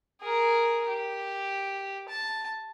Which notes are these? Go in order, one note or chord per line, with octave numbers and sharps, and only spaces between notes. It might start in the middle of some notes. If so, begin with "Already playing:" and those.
G#4 A#4
G4
A5